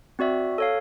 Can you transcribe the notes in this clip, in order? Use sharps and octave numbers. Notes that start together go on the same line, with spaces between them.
C4 F#4 D5 E5
A4 C#5 F5